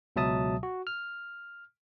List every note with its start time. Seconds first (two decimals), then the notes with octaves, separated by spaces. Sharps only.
0.16 C#2 B2 F#3 E5 A5 D#6
0.63 F#4
0.87 F6